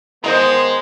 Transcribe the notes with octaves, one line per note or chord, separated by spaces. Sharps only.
D#3 G#3 B3 C5 D#5 A#5 C6